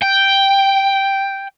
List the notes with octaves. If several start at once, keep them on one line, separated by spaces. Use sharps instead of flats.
G5